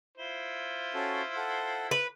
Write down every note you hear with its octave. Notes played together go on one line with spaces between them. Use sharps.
E4 F4 C5
C#4 F#4 A4
A4 F#5
B4